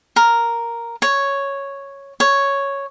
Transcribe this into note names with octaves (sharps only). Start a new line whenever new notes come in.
A#4
C#5
C#5